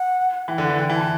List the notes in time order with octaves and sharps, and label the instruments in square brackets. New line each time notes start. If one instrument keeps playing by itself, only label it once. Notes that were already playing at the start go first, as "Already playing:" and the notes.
Already playing: [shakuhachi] F#5
[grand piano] E3 [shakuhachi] G5
[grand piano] D3
[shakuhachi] F#5
[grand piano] E3
[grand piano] D3 [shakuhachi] G5
[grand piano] E3
[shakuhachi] A5
[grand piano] E3